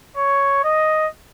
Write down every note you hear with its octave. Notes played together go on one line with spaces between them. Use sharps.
C#5
D#5